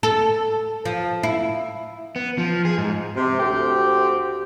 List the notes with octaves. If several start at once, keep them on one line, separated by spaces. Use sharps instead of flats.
A4
F3
E4
B3
F3
G#4
G#2
C3
D2 C4 G4